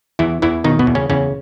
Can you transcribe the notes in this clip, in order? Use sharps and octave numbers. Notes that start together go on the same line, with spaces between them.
E2 E3 E4
E2 E3 E4
B2 D#3 D#4
B2 B3
E2
C#3 C#4
E2 C#3 C#4